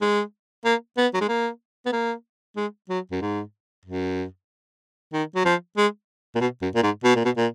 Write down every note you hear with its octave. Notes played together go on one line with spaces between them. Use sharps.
G#3
A#3
B3
F#3
G#3
A#3
B3
A#3
G#3
F#3
F#2
G#2
F#2
D#3
F#3
F3
G#3
A#2
B2
F#2
A#2
G#2
B2
A#2
B2
A#2